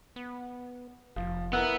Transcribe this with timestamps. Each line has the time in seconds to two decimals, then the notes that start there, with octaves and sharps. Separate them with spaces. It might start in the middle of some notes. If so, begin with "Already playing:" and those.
0.16 B3
1.16 F1 F3
1.53 B3 E4 A#4 F#5 E6 F#6